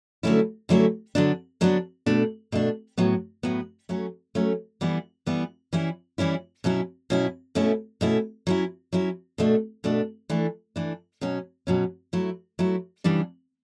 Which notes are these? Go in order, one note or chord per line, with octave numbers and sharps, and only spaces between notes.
D3 F#3 A3 C#4 E4
D3 F#3 A3 C#4 E4
D3 F#3 B3 D4
D3 F#3 B3 D4
B2 A3 D4
B2 A3 D4
A2 F#3 B3
A2 F#3 B3
F#3 A3 C#4
F#3 A3 C#4
E3 G3 B3 E4
E3 G3 B3 E4
E3 G3 C#4 E4
E3 G3 C#4 E4
B2 F#3 C#4 E4
B2 F#3 C#4 E4
B2 A3 C#4 E4
B2 A3 C#4 E4
F#3 C#4 E4
F#3 C#4 E4
B2 A3 D4
B2 A3 D4
E3 A3 D4
E3 A3 D4
B2 F#3 C#4
B2 F#3 C#4
F#3 A3 E4
F#3 A3 E4
C#3 E3 G3 D4